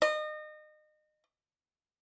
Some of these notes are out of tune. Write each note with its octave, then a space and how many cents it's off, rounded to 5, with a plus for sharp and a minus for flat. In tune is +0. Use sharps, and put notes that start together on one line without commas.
D#5 -30